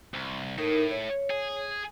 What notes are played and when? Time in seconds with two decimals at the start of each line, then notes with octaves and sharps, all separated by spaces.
0.14 C2
0.58 A2 D#4 A#4
0.91 C#5
1.30 G#4